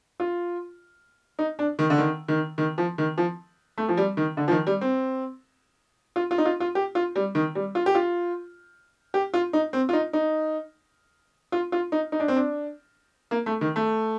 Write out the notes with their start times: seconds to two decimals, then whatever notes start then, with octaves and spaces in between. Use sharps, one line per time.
0.20 F4
1.39 D#4
1.59 D4
1.79 D#3
1.90 D3
1.98 D#3
2.28 D#3
2.58 D#3
2.78 F3
2.98 D#3
3.18 F3
3.78 A3
3.89 F3
3.97 G3
4.17 D#3
4.37 D3
4.48 F3
4.51 D#3
4.67 G3
4.81 C4
6.16 F4
6.31 F4
6.38 D#4
6.45 F4
6.60 F4
6.75 G4
6.95 F4
7.16 G3
7.35 D#3
7.55 G3
7.75 F4
7.86 G4
7.95 F4
9.14 G4
9.34 F4
9.53 D#4
9.73 C4
9.89 F4
9.93 D#4
10.13 D#4
11.52 F4
11.72 F4
11.92 D#4
12.12 D#4
12.20 D4
12.28 C4
12.36 D4
13.31 A#3
13.46 A3
13.61 D#3
13.76 A3